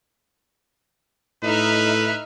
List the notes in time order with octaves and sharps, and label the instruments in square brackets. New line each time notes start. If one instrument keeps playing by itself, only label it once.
[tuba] A2 [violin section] D#4 E5 F6 [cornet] B4